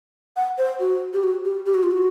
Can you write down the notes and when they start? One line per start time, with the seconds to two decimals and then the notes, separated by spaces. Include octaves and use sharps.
0.37 F#5
0.58 C5
0.80 F#4
1.14 G4
1.24 F#4
1.45 G4
1.66 G4
1.75 F#4
1.83 F4
1.91 F#4